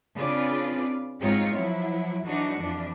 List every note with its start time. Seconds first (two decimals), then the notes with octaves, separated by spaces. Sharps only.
0.16 C#3 C4 D4 F4 B4 D5
1.21 G#2 C4 D#4 F4 C#5
1.53 F3 F#3 E4
2.26 E3 F#3 D4 D#4 F#4
2.60 F2 E3 F3 D4